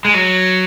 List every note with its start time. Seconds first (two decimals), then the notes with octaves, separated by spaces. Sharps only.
0.05 G#3
0.14 F#3